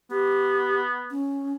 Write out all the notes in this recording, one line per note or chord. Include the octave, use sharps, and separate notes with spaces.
B3 G4
C#4